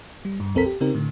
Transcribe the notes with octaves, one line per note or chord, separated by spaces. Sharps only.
G3
G2
B1 F2 C4 A4 A#4 B6
G4
C#3 C4 D#4 G4 A#4
A2 D3